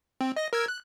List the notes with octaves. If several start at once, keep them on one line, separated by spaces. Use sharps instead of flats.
C4
D#5 A#6
A#4 E6 G#6
F#6